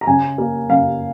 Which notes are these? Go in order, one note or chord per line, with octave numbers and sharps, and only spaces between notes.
A#5
C#3 G#5
A#3
C#3 F5